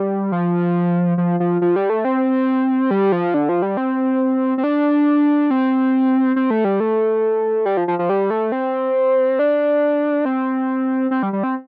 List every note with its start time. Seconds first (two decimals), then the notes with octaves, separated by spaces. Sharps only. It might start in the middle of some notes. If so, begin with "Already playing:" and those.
Already playing: G3
0.32 F3
1.18 F3
1.40 F3
1.62 F3
1.76 G3
1.90 A3
2.05 C4
2.91 G3
3.12 F3
3.34 D3
3.49 F3
3.62 G3
3.77 C4
4.58 C4
4.64 D4
5.51 C4
6.36 C4
6.50 A3
6.65 G3
6.80 A3
7.66 G3
7.77 F3
7.88 F3
7.99 F3
8.09 G3
8.30 A3
8.52 C4
9.39 D4
10.25 C4
11.11 C4
11.23 G3
11.33 G3
11.43 C4